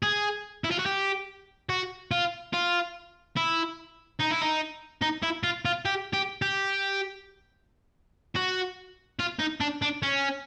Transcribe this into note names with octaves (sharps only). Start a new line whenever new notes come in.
G#4
E4
F4
F#4
G4
F#4
F4
F4
E4
D#4
E4
D#4
D#4
E4
F4
F4
G4
G4
G4
F#4
F4
D#4
D4
D4
C#4